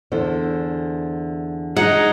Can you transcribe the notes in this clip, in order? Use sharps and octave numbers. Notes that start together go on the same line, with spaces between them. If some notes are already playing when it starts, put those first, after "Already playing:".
E2 D3 C5
G#3 D#4 F#5